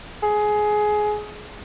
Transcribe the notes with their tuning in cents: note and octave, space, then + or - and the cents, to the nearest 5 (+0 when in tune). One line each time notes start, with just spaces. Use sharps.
G#4 +15